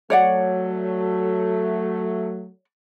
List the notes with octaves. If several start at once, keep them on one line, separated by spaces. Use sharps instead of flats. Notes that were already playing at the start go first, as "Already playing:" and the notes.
F#3 A3 C#5 D5 F#5